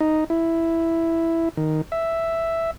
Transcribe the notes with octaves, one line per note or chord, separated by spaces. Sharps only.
D#4
E4
D#3
E5